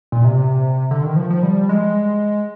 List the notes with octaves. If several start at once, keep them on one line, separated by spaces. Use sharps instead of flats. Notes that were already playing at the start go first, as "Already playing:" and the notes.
A#2
C3
D3
D#3
F3
F3
G3
G#3